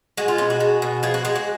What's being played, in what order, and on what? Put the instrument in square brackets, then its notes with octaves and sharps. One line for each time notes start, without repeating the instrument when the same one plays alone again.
[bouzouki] G#3 F#4
F4
B2 C#4
F#4
G#3
B2
F3 G#4
F#4
G#3 G#4
F#4